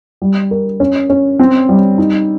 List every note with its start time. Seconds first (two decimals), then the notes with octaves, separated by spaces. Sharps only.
0.22 G3
0.51 A#4
0.80 C#4
1.10 C#4
1.39 C4
1.69 G3
1.98 D#4